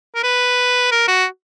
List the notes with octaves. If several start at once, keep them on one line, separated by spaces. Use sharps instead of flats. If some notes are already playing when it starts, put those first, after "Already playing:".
A#4
B4
A#4
F#4